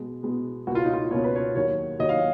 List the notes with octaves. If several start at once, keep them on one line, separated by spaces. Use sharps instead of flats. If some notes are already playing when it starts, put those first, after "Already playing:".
Already playing: B2 G#3 B3
B2 G#3 B3
C#2 B2 A#3 C#4 F#4
F4
D#4
F4
C#2 B2 A#3 C#4 C#5
B4
C#5
D#2 D#3 F#3 C#5
D#2 D#3 F#3 D#5
F5